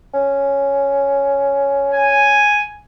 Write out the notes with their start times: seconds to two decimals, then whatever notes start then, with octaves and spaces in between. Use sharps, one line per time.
0.14 C#4
1.93 G#5